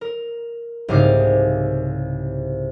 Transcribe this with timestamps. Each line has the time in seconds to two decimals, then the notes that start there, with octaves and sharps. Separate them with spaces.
0.01 A#4
0.88 C2 G#2 C#3 F5 D6